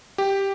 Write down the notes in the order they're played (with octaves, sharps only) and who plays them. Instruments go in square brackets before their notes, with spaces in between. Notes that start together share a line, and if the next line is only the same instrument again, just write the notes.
[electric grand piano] G4